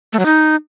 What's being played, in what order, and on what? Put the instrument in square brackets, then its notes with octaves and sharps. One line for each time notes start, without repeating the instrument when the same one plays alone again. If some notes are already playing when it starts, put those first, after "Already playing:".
[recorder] A3
F#3
D#4